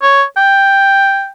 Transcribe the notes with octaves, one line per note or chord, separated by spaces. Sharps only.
C#5
G5